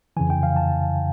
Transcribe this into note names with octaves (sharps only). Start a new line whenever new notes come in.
F2 C#3 E3 G#5
G5
F5
A5